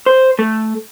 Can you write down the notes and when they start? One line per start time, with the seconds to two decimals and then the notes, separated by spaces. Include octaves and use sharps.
0.06 C5
0.39 A3